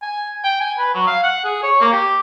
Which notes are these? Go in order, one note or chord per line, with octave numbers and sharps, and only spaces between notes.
G#5
G5
G#5
B4
F#3
F5
F#5
G#4
C#5
A#3
G4